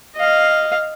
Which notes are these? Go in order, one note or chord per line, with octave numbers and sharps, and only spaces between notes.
D#5 F5